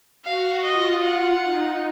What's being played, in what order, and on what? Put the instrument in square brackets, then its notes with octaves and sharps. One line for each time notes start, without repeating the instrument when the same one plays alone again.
[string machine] F#4 [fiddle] F5
[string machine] F4 [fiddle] D#5
[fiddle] F#5
[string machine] D#4